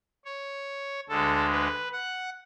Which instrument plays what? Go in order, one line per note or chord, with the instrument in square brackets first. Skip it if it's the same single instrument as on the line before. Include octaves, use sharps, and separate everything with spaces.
[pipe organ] C#5
D2 D3 G#3 A4
B4
F#5